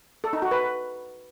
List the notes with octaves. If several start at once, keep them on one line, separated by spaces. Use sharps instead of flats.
A4
D#4
F#4
B4